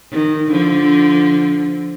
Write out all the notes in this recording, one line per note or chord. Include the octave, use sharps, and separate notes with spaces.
D#3
D3 F3